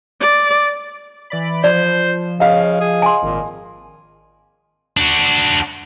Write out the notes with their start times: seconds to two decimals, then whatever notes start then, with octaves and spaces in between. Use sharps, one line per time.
0.20 D5
1.30 E3 D5 B5
1.64 F3 C5 D5
2.40 C#3 D#5 F5
2.81 G#4
3.02 G#5 C6
3.23 G#1 A#2
4.97 D4 F#4